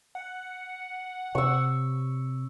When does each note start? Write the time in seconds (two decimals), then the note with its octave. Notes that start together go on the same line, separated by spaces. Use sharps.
0.15 F#5
1.35 C3 C#6 E6